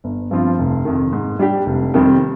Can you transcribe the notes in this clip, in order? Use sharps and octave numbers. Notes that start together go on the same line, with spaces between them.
G1
G2 F3 C4 F4
F1
F2 D#3
G#2
G3 D4 G4
F1
F2 D#3 G3 C4